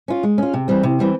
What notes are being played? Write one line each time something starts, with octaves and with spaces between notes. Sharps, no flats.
C#4 F4
G#3
C#4 F4
C3
E3 G3 C4
C3
E3 G3 C4